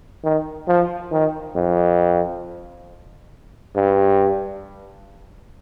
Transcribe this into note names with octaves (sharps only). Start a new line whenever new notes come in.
D#3
F3
D#3
F2
G2